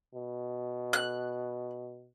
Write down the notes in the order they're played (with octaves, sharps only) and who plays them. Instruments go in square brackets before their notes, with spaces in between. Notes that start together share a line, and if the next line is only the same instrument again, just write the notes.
[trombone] B2
[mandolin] F#6